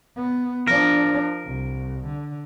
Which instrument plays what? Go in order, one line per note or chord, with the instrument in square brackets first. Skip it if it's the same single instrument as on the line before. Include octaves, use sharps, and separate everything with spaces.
[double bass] B3
[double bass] F3 D4 [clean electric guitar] A#4
[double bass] C2
D3